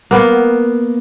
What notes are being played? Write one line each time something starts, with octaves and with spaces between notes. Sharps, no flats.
A#3 B3